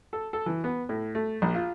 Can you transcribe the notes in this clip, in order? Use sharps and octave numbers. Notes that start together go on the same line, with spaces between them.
A4
A4
E3
B3
A2
A3
A#1
F4